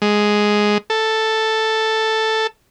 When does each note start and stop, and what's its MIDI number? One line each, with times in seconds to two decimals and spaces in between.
0.02 0.78 56
0.90 2.47 69